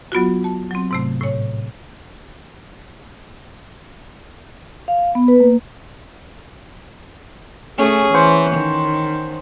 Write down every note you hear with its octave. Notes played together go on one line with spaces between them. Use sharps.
F#3 B3 F4 F#4
A5
F#3 C4
G#2 C3 A3
A2 C#5
F5
B3
B4
A#3
A3 C#4 G#4
E3 C5 F#5
D#3